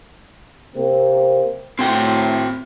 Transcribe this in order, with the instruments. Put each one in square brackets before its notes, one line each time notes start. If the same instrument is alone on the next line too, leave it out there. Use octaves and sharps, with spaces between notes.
[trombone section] C3 A#3 C4
[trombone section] A2 [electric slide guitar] C4 F#4 G5